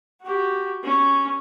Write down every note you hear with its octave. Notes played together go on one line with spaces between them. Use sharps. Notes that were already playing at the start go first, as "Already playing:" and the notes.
F#4 G4
C#4